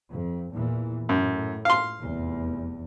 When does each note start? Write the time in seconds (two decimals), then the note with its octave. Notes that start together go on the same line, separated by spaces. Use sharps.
0.10 F2
0.52 E2 A#2 E3
1.09 F#2 A2
1.65 F5 C6
2.02 F1 E2